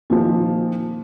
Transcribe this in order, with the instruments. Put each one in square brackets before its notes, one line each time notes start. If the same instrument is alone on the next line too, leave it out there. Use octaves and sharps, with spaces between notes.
[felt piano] A#2 D#3 F3